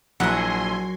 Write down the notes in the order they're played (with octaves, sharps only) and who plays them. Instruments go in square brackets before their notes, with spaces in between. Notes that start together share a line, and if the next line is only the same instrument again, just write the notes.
[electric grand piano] A#1 [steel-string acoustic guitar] F#3 A#4 [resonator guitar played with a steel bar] E4 F#5 [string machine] G#5 C6